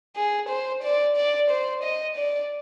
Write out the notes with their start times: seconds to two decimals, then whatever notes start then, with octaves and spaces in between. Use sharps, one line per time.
0.16 G#4
0.49 C5
0.83 D5
1.16 D5
1.50 C5
1.83 D#5
2.17 D5